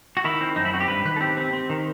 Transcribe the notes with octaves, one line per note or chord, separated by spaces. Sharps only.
F#4
D#3 E4
C4
F#2 D#4
E4
C4 F#4
G4
G2 B4
D#3 B4
A4
C4 G4
C4
C4
D#3